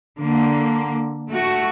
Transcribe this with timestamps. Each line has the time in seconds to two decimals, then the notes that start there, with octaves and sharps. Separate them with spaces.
0.18 D3 A#3
1.29 A3 F#4